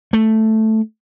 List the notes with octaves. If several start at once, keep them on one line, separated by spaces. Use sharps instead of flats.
A3